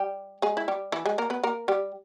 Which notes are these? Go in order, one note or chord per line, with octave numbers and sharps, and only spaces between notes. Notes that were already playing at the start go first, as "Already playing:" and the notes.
Already playing: G3 G4
G#3 G#4
E4
G3 G4
E3 E4
G#3 G#4
A#3 A#4
B3 B4
A#3 A#4
G3 G4